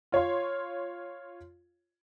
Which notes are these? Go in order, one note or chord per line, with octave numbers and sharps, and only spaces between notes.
F4 C#5 F5 C6